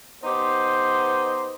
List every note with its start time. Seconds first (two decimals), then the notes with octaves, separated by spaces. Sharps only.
0.24 B3 D#4 G4 C5